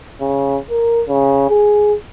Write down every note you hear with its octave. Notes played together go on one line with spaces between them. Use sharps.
C#3
A#4
C#3
G#4